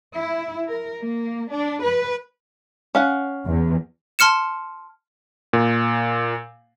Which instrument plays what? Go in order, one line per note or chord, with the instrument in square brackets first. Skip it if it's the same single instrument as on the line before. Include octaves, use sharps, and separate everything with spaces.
[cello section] E4
A#4
A#3
D4
B4
[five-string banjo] C#4 F5 F#5
[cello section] E2
[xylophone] A5 C6 F6 C#7 E7
[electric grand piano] A#2